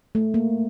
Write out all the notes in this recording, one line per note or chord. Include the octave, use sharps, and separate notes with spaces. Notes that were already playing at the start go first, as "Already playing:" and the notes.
A3
A#3